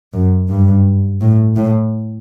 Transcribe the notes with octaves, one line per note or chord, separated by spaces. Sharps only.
F#2
G2
A2
A2